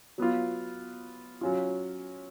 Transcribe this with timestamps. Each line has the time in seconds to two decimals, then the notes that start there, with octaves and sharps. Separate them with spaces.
0.18 F#3 B3 F4
1.41 F#3 C#4 F4